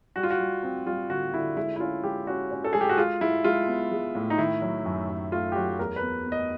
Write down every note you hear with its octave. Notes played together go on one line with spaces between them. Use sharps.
G3 F#4
F4
F#4
G3
C4
G3 F4
D3 F#4
D3 E4
G#3 E4
E4
C#4 F4
G#3 G4
C#4 F#4
C#4
A4
G#3 G#4
G4
F#4
G#3 F4
G#3 E4
G#3 F4
B3
G#3
A2
D#4
D#3 E4
F#3
F#2
F#2
A3 F4
G4
F#3 F#4
E2 A#4
B4
B3
B3
D#5